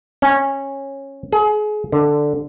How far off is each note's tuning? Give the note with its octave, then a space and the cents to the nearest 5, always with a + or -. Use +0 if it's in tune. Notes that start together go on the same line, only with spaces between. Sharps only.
C#4 -15
G#4 +30
D3 +5